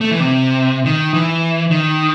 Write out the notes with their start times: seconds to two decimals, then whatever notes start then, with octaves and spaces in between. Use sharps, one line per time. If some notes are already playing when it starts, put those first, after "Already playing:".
0.01 A3
0.11 E3
0.20 C3
0.86 D#3
1.14 E3
1.71 D#3